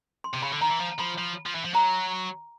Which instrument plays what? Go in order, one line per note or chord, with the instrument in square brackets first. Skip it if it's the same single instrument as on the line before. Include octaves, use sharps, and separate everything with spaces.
[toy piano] C6
[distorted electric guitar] C3
[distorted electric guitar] C#3 [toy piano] B5
[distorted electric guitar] D3
[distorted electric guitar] D#3 [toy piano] A#5
[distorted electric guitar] E3
F3
[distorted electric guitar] F3 [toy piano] B5
[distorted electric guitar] F3
F3
E3
F3
[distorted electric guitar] F#3 [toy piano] A#5